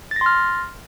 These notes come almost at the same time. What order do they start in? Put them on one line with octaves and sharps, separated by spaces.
A6 A#6 C6 F6